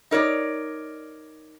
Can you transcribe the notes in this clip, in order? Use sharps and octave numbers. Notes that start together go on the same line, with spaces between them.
D#4 A#4 C#5 D5